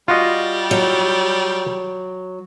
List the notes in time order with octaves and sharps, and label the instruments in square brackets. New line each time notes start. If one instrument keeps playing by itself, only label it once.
[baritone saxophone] G3 [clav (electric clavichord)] F4 F#4 D#5
[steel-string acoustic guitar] F#3